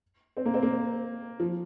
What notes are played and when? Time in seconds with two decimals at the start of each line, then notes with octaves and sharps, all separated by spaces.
0.37 C4
0.45 A#3
0.54 C4
0.63 A#3
1.40 F3